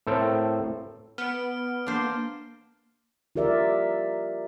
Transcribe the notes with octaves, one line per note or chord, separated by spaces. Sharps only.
A2 C4 A4 A#4 G5
B3 F6 D7
A#3 D4 C5
F4 G4 A#4 D5 E5